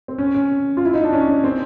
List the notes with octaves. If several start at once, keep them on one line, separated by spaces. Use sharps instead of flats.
C4
C#4
C#4
F4
E4
D#4
D4
C#4
C#4
C4